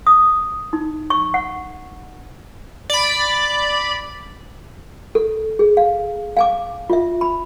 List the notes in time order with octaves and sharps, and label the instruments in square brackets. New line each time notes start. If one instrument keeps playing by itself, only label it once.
[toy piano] D#6
D#4
C#6
F#5
[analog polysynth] D5 B5
[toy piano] A4
G#4
F5
F5 G#5 D6
F4 E5
B5